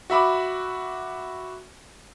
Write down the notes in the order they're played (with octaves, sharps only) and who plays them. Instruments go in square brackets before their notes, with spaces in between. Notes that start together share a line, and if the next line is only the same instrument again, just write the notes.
[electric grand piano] F#4 E5 B5 D6